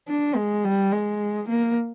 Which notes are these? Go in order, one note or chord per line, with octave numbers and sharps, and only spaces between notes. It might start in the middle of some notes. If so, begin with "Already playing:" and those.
D4
G#3
G3
G#3
A#3